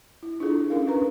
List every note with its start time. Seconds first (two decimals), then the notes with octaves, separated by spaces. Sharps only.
0.23 E4
0.40 D4 E4 F4 G#4 A4
0.70 C#4 D#4 A#4 F5
0.87 D4 B4 A#5